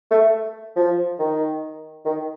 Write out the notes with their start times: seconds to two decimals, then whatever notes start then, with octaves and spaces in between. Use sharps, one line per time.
0.11 A3
0.76 F3
1.19 D#3
2.05 D#3